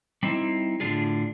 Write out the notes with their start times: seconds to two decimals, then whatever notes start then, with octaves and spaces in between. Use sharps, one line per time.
0.23 G3 C4 D#4 E4
0.80 A2 D3 D4 F4 G#4